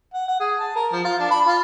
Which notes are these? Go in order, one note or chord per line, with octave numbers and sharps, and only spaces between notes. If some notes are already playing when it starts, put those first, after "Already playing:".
F#5
F#5
G#4
A5
A#4
F3
F4
D4
B5
F4